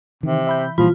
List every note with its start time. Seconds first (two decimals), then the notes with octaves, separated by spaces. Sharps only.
0.23 C3 D#3 E3
0.47 E5 B5 G6
0.78 A#2 E3 F3 G3 E4 F4 B5